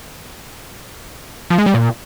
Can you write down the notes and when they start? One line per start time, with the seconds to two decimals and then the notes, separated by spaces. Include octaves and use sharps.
1.50 F3
1.58 G#3
1.66 G3
1.74 A#2